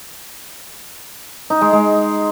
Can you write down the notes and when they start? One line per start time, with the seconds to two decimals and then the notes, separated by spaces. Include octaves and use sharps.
1.50 D#4
1.62 G#3
1.73 G#3